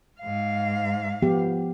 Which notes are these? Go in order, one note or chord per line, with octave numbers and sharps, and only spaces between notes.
G#2 F5
F3 B3 G4